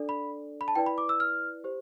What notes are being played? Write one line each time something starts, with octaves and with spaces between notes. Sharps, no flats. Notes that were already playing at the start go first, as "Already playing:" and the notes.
Already playing: D4 A4 D5
B5
B5
A5
E4 B4 D5 G5
B5
D6
E6
F6
G4 C5